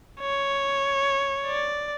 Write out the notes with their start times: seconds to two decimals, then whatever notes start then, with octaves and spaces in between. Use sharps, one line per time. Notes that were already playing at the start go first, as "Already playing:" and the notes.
0.20 C#5
1.47 D5